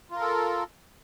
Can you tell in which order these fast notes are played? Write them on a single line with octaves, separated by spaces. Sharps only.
F4 A#4 A4